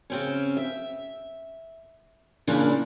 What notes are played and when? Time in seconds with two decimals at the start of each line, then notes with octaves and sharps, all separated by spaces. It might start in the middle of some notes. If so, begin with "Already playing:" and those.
0.10 C#3 C4 C#4
0.57 E5
2.47 A#2 C#3 E3 F3 A#3 D4